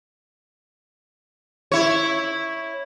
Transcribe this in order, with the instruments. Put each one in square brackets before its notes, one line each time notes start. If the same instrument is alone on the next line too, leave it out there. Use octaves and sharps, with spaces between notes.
[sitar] E4 C#5